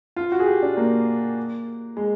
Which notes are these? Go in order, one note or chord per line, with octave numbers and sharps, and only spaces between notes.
F4
F#4
G#4
G4
D4
A#3
G#3